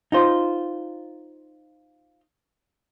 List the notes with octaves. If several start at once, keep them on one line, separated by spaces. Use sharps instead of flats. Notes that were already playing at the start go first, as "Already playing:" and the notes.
D#4 F4 C5